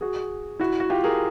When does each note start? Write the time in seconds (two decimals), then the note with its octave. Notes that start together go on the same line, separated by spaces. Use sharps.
0.01 F#4 G#4
0.59 E4 F#4
0.80 F#4
0.90 F4 G4
1.04 G#4 A#4